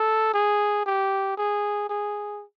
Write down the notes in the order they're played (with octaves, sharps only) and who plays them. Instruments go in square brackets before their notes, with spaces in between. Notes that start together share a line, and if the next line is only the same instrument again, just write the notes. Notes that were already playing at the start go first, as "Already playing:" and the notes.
Already playing: [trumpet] A4
G#4
G4
G#4
G#4